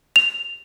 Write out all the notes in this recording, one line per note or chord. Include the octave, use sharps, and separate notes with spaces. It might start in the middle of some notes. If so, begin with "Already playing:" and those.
F7